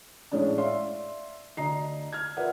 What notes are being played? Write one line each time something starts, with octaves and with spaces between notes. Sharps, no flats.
A2 G#3 C#4 D4
D5 E5 F5 C6
D2 D4 D#5 A#5 C7
F6 G#6
F4 A#4 B4 D5 E5 F#5